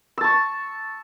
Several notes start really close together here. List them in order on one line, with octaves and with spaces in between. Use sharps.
E6 A5 C#6